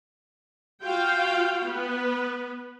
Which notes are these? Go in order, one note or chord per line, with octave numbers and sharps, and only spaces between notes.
F4 F#4 F5 G5
B3 B4